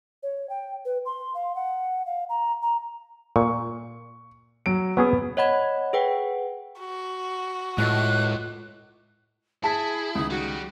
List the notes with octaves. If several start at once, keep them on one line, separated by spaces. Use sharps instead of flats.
C#5
G5
B4
C6
F5
F#5
F5
A#5
A#5
A#2 C#6
F#3 D7
F#3 B3 C#4 G#4
C#5 D#5 F#5 B5 G#6
G#4 B4 F#5 G5
F#4
A2 G#3 F4 D#5 F#6
E4 G#4 A5 B6
C#2 D#3 D#6
G3 F#4